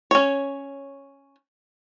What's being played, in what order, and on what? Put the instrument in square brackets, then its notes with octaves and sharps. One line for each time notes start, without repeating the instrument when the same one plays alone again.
[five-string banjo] C#4 C#5